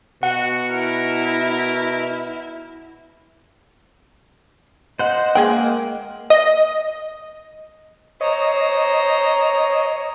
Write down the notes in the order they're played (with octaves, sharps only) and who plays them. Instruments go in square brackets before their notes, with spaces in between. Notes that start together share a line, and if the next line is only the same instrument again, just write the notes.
[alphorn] B2 [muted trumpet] F#4 [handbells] F#5
[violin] E4 [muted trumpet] A#4
[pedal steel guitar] C5 F#5 [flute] D#5
[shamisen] G#3 G#4 G5 [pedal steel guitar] A#3 F#5
[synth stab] D#5
[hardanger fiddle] C5 A#5 [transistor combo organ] C#5 D#5